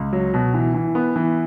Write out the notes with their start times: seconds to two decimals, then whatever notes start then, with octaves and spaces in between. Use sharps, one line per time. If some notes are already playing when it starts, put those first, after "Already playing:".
Already playing: C#2
0.13 F#3
0.34 B2
0.54 E3
0.74 E3
0.95 B3
1.16 E3